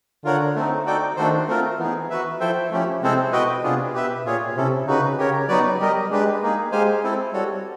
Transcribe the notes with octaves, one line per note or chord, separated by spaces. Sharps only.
D3 F4 A#4 C#5 F#5
A3 C4 D#4
D#4 F#4 A4 D5 G5
D#3 A3 D4 F#4 A4 C5
A3 C4 F4 A#4
E3 B3 D#4 G#4
E3 F#4 B4 E5
F3 E4 A4 C5 E5 G5
F3 A3 C#4 E4 G4
C3 G#3 C4 E4 A4 C5
B2 F#4 B4 D#5 G5
C3 B3 D4 F4 G#4
B2 G4 B4 E5
A#2 F4 G#4 C#5
C3 C#4 E4 A4
C#3 D#4 F#4 B4
C#3 G4 A#4 C#5
F#3 B3 D#4 F#4 B4 D5
G3 G4 A#4 D#5
G#3 D4 G4 B4
A#3 D#4 G#4
G#3 G4 C5 F5 G#5
C4 E4 A4
G3 F#4 A4 C#5